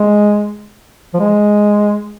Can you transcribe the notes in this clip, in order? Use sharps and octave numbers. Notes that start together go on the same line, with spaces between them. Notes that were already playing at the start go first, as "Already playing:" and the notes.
Already playing: G#3
F3
G#3